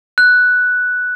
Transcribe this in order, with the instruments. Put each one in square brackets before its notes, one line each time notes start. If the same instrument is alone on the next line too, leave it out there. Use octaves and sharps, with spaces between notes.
[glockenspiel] F#6